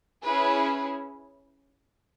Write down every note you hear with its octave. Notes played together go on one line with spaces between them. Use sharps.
C#4 E4 G#4 B4